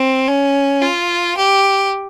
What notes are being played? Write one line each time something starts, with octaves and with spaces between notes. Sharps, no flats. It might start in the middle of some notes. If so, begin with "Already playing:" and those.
Already playing: C4
C#4
F4
G4